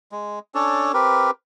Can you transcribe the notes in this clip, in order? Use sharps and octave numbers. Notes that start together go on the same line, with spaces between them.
G#3
C#4 D4 A4 C#5
C4 G4 A#4 B4